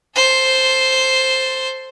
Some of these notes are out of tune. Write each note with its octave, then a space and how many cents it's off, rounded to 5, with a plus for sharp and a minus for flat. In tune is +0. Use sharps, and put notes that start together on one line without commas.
A4 +0 C5 +0